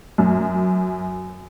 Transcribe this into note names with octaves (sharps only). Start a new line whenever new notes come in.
F#2